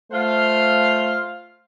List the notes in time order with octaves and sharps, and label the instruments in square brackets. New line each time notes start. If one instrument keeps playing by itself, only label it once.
[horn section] A3 F4 C5 F5